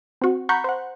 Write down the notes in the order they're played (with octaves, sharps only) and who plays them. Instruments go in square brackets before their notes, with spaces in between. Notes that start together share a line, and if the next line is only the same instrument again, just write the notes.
[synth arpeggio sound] C4 F#4
F#5 A#5 B5 C#6 G6
C5 F#5